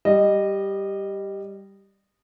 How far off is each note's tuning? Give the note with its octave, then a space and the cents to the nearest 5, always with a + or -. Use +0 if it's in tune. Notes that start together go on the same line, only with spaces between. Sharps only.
G3 +0 D#5 -15